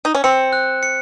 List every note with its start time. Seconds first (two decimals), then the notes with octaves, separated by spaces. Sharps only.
0.05 D#4
0.15 C#4
0.24 C4 C#7
0.53 F#6
0.83 C#7